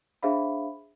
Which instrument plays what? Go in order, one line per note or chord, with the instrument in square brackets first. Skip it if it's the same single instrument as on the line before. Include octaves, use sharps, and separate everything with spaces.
[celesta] D4 G#4 C5 E5 F5 B5